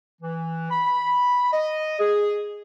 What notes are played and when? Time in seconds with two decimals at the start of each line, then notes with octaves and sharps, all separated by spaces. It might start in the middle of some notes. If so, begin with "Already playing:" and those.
0.22 E3
0.71 B5
1.53 D#5
1.99 G#4